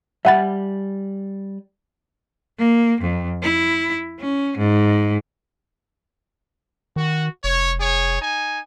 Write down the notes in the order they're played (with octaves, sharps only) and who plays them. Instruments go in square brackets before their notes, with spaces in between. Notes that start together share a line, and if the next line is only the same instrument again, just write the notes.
[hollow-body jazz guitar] G3 G#5 B5 [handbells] E5 F#5 A6
[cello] A#3
F2
E4
C#4
G#2
[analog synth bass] D#3 [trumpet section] F#4
[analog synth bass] F1 [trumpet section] C#5
[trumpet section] G#4 C#5
D#4 G#5